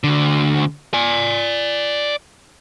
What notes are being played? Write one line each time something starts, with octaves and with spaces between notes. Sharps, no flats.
D2 D3
D5 G#5